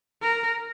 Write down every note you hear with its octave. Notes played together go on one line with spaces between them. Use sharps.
A#4